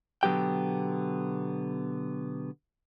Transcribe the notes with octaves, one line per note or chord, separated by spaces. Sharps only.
B2 D3 F#3 B3 G4 G5